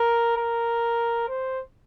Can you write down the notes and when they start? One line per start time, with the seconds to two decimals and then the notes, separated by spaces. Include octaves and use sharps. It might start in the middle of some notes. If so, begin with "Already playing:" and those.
Already playing: A#4
0.37 A#4
1.28 C5